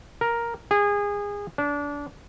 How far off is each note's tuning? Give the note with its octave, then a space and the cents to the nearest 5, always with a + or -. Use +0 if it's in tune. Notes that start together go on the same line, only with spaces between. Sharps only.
A#4 +5
G#4 -25
D4 -25